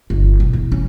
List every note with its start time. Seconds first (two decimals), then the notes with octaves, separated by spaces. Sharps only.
0.10 G1
0.40 B2
0.53 E2
0.72 C#4